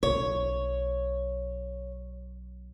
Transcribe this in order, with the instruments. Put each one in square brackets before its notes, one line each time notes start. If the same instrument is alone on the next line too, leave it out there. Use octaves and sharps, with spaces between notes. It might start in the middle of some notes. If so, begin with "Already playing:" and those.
[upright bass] B1 [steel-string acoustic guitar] C#5